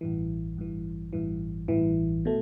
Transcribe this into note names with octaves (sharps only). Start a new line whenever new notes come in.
A1 G2 E3
A1 G2 E3
A1 G2 E3
A1 G2 E3
B2 A3